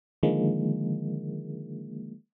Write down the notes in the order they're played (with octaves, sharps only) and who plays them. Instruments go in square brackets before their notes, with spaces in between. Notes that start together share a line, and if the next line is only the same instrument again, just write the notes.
[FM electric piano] D3 D#3 F3 G#3 A#3